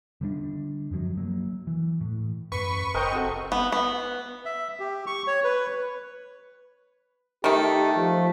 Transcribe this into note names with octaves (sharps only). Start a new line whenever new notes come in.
D3 G3 G#3 D4
F#2 F3 F#3
F#3 A#3
E3
A2
F#2 B4 C#6
F#1 A#4 C5 D#5 G5
C4 F#4 A4
B3
B3
E5
G4
C#6
C#5
B4
D#3 A3 G4
F3